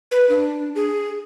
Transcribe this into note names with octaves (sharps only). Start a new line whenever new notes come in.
B4
D4
G#4